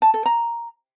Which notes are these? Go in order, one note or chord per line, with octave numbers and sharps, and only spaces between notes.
A5
A4
A#5